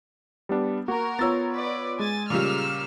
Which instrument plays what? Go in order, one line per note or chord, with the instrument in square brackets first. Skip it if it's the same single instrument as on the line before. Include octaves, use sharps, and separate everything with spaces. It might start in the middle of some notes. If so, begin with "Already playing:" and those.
[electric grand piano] G3 B3 D4
[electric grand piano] A#3 F#4 [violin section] A#4
[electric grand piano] B3 F4 C#5 [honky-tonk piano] E6 A6
[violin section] B4 D5
[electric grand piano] G#3 [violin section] G#5 A6
[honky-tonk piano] A#2 C#3 G3 [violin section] E6 F6